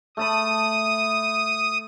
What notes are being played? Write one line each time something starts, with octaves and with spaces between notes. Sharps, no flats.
A3 A5 B5 D#6